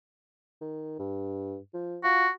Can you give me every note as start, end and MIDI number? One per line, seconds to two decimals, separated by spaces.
0.61 0.96 51
0.99 1.57 43
1.74 1.98 53
2.04 2.26 65
2.04 2.30 66